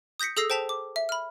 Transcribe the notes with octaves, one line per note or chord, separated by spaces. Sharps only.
D#6 G6 A#6 B6 C#7
G#4 A4 D#6 E6 A#6 C7
C5 G5 A5 B6 F7
D6
E5
B5 F6